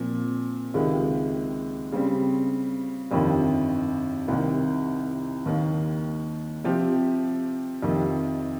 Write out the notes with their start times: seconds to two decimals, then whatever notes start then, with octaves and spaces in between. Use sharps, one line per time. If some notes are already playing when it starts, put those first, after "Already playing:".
Already playing: A#2 F3 C4
0.74 C#2 C3 D#3 G#3
1.92 C#3 G3 C4
3.11 G1 F2 C3 D#3
4.28 C2 C3 D#3
5.46 D#2 D#3 A#3
6.64 C3 F3 C4 G4
7.82 F2 C3 D#3